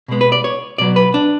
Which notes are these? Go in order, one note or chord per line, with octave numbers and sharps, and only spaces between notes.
B2 G#3 B3
B4
D5
C#5
B2 F#3 B3 D5
B4
D4